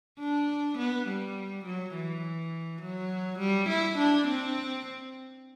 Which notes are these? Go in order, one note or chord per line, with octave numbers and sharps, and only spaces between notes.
D4
B3
G3
F#3
E3
F#3
G3
E4
D4
C4